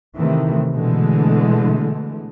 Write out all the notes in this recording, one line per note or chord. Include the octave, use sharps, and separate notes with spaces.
C3 D#3 E3 A3
B2 D3 E3 G#3 A3